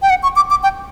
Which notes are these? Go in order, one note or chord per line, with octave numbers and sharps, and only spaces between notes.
G5
F#5
C#6
D6
D6
G5